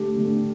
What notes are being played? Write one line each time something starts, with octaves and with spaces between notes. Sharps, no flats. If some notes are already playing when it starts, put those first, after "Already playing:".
Already playing: D3 A3 G4
D3 A3